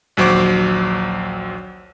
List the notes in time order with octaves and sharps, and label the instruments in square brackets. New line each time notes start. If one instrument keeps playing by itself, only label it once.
[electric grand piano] A#1 D#2 F#3 C5 C#6 D6